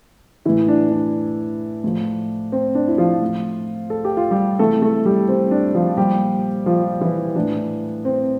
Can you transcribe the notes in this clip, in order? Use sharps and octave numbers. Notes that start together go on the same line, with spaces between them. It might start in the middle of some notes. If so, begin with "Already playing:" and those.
A2 E3 E4
D4
D4
A2 F3
C4
D4
E4
F3 F4
A2 F3
A4
G4
F4
G3 G4
C3 E3 A3 A4
A3 A4
G3 G4
C4
D4
F3 F4
A#2 F3 G3 G4
F3 F4
E3 E4
A2 E3 D4
C4